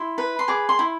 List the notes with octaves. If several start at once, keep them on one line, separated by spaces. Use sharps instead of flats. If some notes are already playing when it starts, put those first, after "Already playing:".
Already playing: E4 C6
B4
C6
G#4 D6
C6
E4